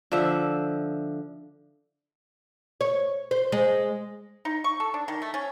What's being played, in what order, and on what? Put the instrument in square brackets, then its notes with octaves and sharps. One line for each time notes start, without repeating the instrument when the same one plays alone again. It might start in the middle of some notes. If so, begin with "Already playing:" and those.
[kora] D3 F3 E5
[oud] C#5
C5
G#3
[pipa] D#4
C#6
A4
D4
D#3
A3
C#4